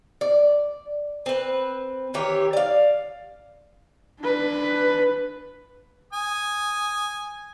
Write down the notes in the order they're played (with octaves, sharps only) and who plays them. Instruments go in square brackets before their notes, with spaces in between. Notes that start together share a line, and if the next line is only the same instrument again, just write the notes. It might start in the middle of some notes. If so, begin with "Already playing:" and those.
[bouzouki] D5
C4 B4
D#3 E3 G4 C#5
D5 F5
[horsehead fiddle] D4 B4
[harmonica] G#5 D#6